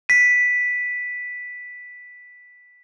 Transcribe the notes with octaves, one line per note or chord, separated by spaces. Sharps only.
B6 D#7